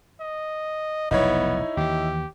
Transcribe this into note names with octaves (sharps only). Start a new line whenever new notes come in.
D#5
F1 B1 B3 D#4 E4 C#5
D#2 E3 G4